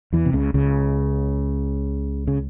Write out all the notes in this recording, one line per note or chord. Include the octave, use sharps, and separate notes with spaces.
E2 E3
C3
C#2 C#3
C#2 C#3
C#3